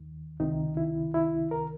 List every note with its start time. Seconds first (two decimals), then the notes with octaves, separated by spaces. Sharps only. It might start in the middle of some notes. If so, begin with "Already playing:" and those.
Already playing: D#2 D#3
0.40 C#2 C3 D#3 D#4
0.77 E4
1.14 E4
1.51 A#4